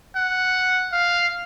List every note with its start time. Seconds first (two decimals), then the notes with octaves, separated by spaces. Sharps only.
0.16 F#5
0.92 F5